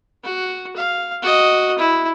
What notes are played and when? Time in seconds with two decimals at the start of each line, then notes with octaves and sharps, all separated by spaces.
0.24 F#4
0.76 F5
1.23 F#4 D#5
1.79 E4